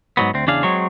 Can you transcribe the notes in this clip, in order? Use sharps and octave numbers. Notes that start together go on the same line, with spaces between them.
G#2 F#3 B3
D2 C4
E2 C#3 D4 G#4 F5
F#3 G#3 C4 C#5